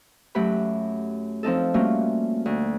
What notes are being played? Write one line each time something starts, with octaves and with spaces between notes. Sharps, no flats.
F#2 F#3 A3 F#4 G4 B5
F3 C4 D#4 A4
G3 A3 A#3 C#4 F4 F#4
D2